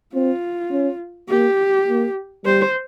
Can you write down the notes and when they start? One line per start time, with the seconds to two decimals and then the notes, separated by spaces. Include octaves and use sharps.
0.14 C4 F4
0.71 C#4
1.29 A#3 G4
1.88 A#3
2.45 G3 C5